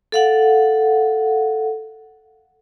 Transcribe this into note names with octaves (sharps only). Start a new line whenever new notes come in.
A4 F5 F#5